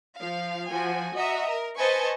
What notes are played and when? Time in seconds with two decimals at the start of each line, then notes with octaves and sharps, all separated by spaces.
0.20 F3 F5
0.69 F3 F#4 G#5
1.15 F#4 D#5 E5 A#5
1.49 A#4
1.79 B4 C5 D#5 G#5 A5 C#6